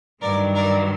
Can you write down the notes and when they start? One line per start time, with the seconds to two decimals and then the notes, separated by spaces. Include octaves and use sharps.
0.21 G2 D#3 F#3 A#4 D5
0.55 A#4 D5